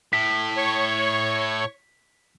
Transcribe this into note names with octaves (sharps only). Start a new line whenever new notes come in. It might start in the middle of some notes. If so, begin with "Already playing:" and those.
A2 B6
C#5 C#6